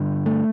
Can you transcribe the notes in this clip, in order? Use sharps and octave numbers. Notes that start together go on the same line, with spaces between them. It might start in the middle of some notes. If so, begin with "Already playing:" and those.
Already playing: G2 D3
A3